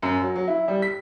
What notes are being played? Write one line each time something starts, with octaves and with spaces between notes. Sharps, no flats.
F#2
F#3
F#3
E4
G3
B6